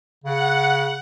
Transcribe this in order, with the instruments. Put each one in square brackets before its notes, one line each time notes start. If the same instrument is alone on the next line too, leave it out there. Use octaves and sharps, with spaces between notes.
[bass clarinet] C#3 [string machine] F#5